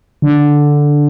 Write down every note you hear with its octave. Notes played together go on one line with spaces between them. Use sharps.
D3